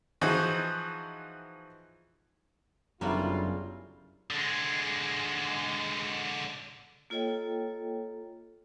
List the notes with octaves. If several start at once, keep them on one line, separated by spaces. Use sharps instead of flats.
E3 F3 D#4 F#4 G#4 C5
G1 F#2 C#3 F#3 G3 E4 F4
D3 G#3
A#3 F4 A4 C#5 D#5 G5